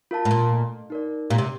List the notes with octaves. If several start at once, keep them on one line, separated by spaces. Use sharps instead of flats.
F4 A#4 F5 A5
A2
A#2
A3
D#4 A#4 D5
A#2 G4
C3